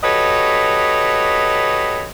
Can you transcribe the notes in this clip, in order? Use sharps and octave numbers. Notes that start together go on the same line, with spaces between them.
F#4 G4 A4 B4 C#5 D#5